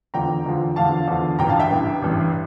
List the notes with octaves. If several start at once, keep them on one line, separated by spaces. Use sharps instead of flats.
E2 D3 F3 G5 A#5
E2 D3 F3
E2 D3 F3 F5 A5
E2 D3 F3
A1 G2 E3 G5 A#5
F5 A5
E5 G5
A1 G2 E3
A1 G2 E3